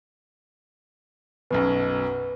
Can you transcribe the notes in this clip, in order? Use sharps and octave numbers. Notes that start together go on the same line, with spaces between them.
B1 F#2 B2 B4